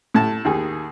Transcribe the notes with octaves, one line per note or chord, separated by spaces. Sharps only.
A2 A5
D#2 D#3 G#4